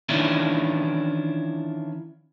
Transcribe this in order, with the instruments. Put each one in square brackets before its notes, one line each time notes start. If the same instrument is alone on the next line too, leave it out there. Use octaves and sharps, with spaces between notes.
[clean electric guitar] D#3 E3 C#4 D4 E4 F4